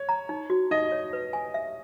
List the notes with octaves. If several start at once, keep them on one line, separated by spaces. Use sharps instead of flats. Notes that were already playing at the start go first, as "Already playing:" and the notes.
Already playing: C#5
A#5
D#4
F#4
D#4 D#5
C#5
B4
G#5
E5